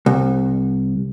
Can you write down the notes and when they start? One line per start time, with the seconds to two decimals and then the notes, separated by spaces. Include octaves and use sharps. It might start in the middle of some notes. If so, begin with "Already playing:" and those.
0.06 C2